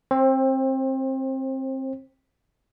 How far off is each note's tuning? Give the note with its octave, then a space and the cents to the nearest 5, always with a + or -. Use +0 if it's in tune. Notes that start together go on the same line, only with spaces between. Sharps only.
C4 +20 C5 +35